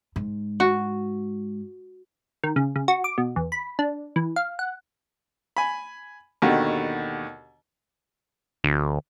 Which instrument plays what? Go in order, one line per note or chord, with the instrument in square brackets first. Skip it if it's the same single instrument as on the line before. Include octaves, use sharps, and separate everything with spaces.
[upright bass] G#2
[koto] F#4
[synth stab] D#3
C#3
C#3
F#4
D6
B2
E2
B5
D4
E3
F5
F#5
[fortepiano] G#5 B5
D#2 B2 D3 F#4 G4
[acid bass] D2